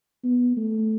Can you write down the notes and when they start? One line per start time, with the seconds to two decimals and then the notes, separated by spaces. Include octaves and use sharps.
0.24 B3
0.57 A3